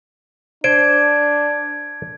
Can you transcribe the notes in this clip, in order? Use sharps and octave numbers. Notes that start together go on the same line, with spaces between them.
D4 C5 G#6 D7